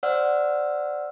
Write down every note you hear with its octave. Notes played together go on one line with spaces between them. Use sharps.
C5 D5 F#5 E6 F6